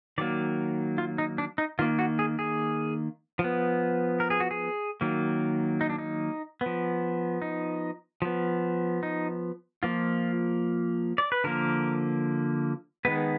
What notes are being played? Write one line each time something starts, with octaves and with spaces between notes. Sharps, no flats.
D#3 F#3 A#3 D5
F4
D#4
D4
D#4
D#3 A#3 F4
F#4
G#4
G#4
F3
B3
A#4
G#4
F#4
G#4
D#3 F#3 A#3
D#4
D4
D#4
F3 B3
D#4
F3 B3
D#4
F3 A#3 F4
D5
B4
D3 F3 A#3 A#4
D#3 G#3 B3 B4